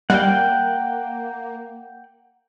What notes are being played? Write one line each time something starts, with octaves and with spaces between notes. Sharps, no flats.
G3 A#3 F#5 G5